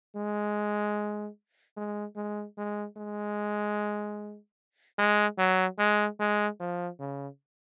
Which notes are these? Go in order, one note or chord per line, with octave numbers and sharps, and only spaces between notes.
G#3
G#3
G#3
G#3
G#3
G#3
F#3
G#3
G#3
F3
C#3